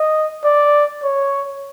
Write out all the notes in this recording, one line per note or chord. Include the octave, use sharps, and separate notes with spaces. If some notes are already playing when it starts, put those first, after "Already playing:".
Already playing: D#5
D5
C#5